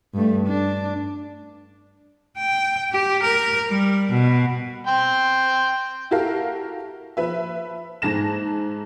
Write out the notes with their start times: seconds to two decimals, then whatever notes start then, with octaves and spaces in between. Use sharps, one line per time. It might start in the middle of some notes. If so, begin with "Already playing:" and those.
0.14 G2 A3
0.47 D4
2.38 G5
2.92 G4
3.23 A#4
3.69 G3
4.11 B2
4.87 G5 C6
6.11 E4 F#4 G4 A4 A#4 F5
7.17 F3 B4 E5
8.02 G#2 G#4 A5 A#6 E7